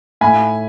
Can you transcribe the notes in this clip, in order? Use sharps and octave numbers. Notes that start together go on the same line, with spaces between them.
A2 G#5 B5